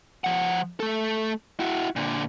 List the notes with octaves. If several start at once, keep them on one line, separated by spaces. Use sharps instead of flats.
F3 F#5
A3 A4
E4 F#4
A#2 D3